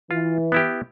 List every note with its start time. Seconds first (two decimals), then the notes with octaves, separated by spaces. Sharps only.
0.11 E3 F4
0.52 B3 E4 G4